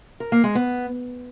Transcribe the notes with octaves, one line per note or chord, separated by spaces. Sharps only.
A#4
A#3
G#3
B3